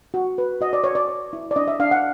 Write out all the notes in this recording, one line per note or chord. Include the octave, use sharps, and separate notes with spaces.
F#4
B4
F#4 D#5
D5
F#4 C#5
D5
C#5
E4
D5
D4 D#5
E5
D4 F5
F#5